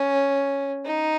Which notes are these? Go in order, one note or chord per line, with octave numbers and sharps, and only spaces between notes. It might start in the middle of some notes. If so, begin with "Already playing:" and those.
Already playing: C#4
D#4